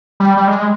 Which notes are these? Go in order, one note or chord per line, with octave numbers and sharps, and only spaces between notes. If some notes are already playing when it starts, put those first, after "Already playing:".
G3
G3
G#3